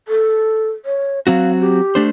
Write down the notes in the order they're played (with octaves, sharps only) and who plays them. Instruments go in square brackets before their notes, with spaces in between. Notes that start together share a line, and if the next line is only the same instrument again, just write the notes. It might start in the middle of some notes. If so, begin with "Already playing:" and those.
[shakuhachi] A4
C#5
[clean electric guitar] F#3 C4 F#4 [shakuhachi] F5
[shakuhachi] G4
[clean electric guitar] A3 D4 C5